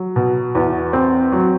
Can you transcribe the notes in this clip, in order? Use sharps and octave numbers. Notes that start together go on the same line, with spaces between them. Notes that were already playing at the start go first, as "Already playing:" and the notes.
Already playing: F#3
B2
E2
C4
F#3